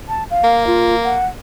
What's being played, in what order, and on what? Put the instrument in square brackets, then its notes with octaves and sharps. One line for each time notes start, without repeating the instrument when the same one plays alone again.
[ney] A5
F5
[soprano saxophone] A#3
[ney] F4
F#5